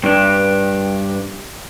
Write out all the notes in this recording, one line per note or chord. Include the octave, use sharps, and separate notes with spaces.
G2 D4